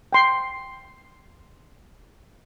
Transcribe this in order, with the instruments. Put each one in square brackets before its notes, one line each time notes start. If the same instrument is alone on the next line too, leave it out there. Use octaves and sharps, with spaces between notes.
[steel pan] G5 C6